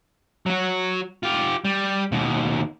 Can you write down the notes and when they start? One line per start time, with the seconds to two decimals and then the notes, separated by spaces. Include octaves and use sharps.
0.46 F#3 F#4
1.23 F4 G4
1.65 G3
2.12 D#2 B2